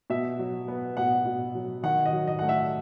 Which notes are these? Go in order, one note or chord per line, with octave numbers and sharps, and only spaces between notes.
B2 E5
F#3
B3
B2 F#5
B2
F#3
D#3 F#5
D#5
F#3
D#5
A3 F#5
E5